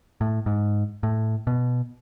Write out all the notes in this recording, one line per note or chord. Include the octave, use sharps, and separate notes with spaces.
A2
G#2
A2
B2